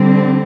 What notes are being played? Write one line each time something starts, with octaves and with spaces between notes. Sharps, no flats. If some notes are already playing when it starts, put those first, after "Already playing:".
Already playing: D3 G3 C4